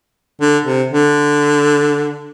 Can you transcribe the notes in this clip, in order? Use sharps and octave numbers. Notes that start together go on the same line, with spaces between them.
D3
C3
D3